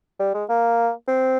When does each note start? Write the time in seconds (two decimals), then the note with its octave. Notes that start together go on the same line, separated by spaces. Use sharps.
0.20 G3
0.34 G#3
0.49 A#3
1.08 C4